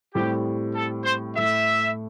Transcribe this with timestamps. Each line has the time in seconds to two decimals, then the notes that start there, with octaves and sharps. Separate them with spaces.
0.14 A2 G3 C4 G4
0.75 A4
1.05 C5
1.35 A2 A3 E4 A4 E5